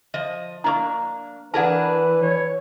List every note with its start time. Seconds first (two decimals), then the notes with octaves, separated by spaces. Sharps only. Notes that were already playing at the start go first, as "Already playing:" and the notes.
0.14 F3 D#5
0.64 A#3 D4 A#5 C#6
1.54 E3 D4 G#4 A#4 B4 F#5 A5
2.22 C#5